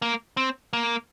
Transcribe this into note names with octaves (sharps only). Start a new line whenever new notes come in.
A#3
C4
A#3